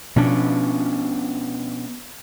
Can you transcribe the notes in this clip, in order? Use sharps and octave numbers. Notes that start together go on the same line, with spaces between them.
B2 F3 C#4 D4